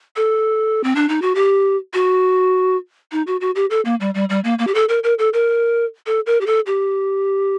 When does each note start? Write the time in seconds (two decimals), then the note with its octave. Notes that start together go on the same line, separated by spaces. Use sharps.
0.16 A4
0.84 C4
0.95 D4
1.09 D#4
1.22 F#4
1.35 G4
1.94 F#4
3.12 D#4
3.27 F#4
3.41 F#4
3.55 G4
3.70 A4
3.85 A#3
4.00 G3
4.14 G3
4.29 G3
4.44 A#3
4.59 A#3
4.67 G4
4.74 A4
4.89 A#4
5.03 A#4
5.19 A4
5.33 A#4
6.06 A4
6.26 A#4
6.41 G4
6.46 A4
6.66 G4